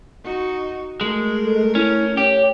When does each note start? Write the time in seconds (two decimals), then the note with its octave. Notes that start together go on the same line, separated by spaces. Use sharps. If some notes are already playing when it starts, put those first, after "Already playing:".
0.24 D#4 F#4
1.01 G#3 A3 A#4
1.44 A4
1.75 C#4 E4
2.17 G4 C#5